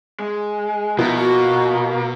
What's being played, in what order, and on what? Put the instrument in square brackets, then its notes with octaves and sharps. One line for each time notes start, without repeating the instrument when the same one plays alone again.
[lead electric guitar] G#3
[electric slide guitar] B2 [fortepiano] F3 B3 E4 [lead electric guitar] D#4 A#4
[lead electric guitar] A#3 [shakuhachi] F#4